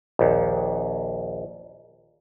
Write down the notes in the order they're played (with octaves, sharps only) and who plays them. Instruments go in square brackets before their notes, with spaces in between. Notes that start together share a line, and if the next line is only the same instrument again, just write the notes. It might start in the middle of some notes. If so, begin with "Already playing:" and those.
[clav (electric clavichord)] A#1 D#2